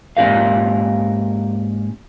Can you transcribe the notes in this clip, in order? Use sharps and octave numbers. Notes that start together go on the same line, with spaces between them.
G#2 A#3 C#4 G4 A#4 F5